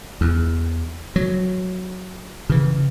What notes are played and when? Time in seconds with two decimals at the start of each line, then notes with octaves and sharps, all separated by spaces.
0.21 E2
1.16 F#3
2.50 C#3 E3